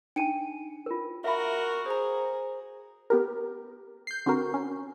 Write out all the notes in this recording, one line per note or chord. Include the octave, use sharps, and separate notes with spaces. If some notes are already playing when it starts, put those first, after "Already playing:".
D4 D#4 G5 G#5 C#7 D#7
F4 A#4
F#4 A#4 E5 F5 B5
G#4 C5 A#5
B3 G4 A#4
G6 C7
D3 C4 F#4 A#4
C#4